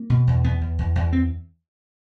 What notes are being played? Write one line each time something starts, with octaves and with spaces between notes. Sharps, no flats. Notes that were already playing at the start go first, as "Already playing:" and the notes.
Already playing: A#3
B2
E2
E2 B3
E2
E2
E2
C4